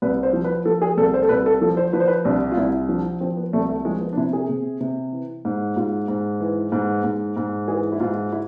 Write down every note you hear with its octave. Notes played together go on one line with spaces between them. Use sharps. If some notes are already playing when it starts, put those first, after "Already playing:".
C2 B4
C5
F3
B4
F3 A4
G#4
C2 A4
C5
A4
C2 B4
A4
F3 A4
C5
F3 B4
C5
B4
C2 D4
F4
C2 E4
F3 D4
F3 C4
B3
C2 A3
A3
F3 G#3
B3
D4
C3 E4
G#4
C3
C3
E3
G#2
G#2 F4
G#2
E3
G#2
G#2
G#2
E3 G#4
E4
G#2 F4
E4